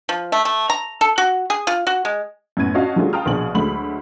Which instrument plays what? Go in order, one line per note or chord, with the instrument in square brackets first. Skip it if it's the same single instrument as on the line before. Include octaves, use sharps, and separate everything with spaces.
[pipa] F3
A3
A3
A#5
A4
F#4
G#4
F4
F#4
G#3
[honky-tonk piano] F#2 A2 B3 G#6 D#7
C#4 D4 F#4 D#5 F5 A5
F#3 G3 A3 D4 F4 G#4
F5 G5 A5 A#5 D#6 F6
A#1 B2 G#4 F#7
D2 F#3 G#3 A3 B5 F#7